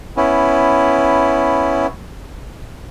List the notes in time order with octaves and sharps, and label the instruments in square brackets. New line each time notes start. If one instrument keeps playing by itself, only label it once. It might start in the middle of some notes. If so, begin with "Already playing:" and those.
[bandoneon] B3 C#4 E4